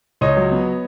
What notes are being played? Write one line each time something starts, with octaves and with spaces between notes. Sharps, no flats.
C#2 C#5 D#5
F#3
B3